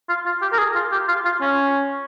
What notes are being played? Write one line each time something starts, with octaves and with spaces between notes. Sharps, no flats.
F4
F4
G4
A#4
G#4
F4
G4
F4
F4
C#4